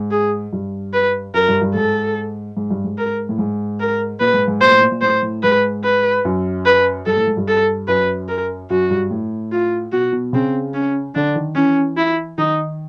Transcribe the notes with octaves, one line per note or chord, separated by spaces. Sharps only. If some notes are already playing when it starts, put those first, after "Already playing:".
Already playing: G#2
G#4
G2
B4
F#2 A#4
G2
G2
G#2 A4
G#2
G2
G#2
A#4
A2
G#2
A#4
A#2 B4
G#2
G#2
A#2 C5
A2
A#2
A#2
A2 C5
A2
G#2 B4
B4
F#2
B4
G2 A4
A2
G#2
G2
A4
F#2 B4
A#4
F#2 F#4
G2
A2
F4
B2 F#4
B2
C#3 C4
C#4
D3 D4
D#3
E3 C#4
E4
D#3 D#4